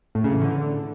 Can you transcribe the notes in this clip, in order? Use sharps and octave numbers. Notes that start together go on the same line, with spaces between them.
A2
C#3
E3
D3